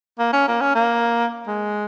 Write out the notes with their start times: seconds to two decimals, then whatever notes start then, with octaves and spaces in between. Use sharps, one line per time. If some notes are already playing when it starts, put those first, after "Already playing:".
0.19 A#3
0.33 C#4
0.48 A#3
0.61 C#4
0.75 A#3
1.47 G#3